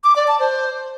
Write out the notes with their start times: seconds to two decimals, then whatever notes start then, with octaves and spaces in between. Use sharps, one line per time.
0.04 D6
0.16 D5
0.28 A5
0.40 C5